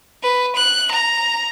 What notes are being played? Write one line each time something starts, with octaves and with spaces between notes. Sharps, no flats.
B4
F#6
A#5